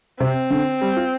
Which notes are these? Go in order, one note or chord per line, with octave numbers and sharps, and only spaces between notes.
C3 C4
D3
G3
F4